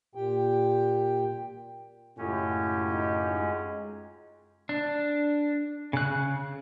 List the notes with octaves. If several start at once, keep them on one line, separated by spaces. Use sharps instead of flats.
A#2 G4 G5
F#2 A2 C#3 G#3 C#4 F4 G4
D#4
G#3
D4
C#3 F#6